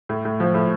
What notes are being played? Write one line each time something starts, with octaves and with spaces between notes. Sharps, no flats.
A2
A2
F3
A2